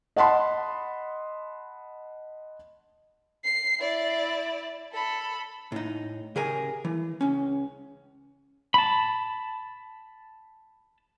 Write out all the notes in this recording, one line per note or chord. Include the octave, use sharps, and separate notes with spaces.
D#5 F#5 A5 B5 C6
C7
E4 D5
A4 B5
A2 D#4
C#3 G4 G#4 A#4 G#5
E3
C#2 C#4
A5 B5